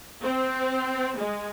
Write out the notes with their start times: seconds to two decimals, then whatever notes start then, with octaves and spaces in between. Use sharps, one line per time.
0.23 C4
1.17 G#3